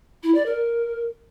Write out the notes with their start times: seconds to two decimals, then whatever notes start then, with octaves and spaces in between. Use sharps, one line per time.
0.23 E4
0.34 D5
0.46 A#4